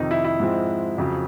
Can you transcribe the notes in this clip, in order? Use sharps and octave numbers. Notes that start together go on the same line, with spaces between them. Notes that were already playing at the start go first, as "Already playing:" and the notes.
Already playing: F2 C3 D#3 D#4
E4
E4
G#2 F3 G#3 C4
F2 C#3 F#3